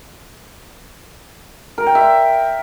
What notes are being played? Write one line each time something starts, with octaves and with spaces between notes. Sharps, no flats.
A#4
G5
E5